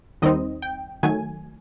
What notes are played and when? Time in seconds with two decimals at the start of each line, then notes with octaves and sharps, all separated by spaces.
0.22 D#2 D#3 G3 C4 D#4 D#5
0.62 G5
1.03 D#3 F#3 A3 G#5